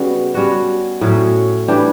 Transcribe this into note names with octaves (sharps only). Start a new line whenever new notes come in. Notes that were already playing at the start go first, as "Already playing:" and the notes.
Already playing: C#3 G3 B3 F#4
G3 C#4 F#4
A2 F#3 C#4
E3 G3 D4 G4